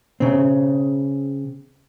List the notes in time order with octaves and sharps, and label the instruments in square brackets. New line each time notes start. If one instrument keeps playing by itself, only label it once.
[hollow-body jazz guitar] C#3 C4